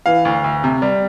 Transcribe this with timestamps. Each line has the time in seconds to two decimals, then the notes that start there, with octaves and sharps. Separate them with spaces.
0.06 E3 F5
0.25 D2
0.44 D2
0.64 C3
0.82 G3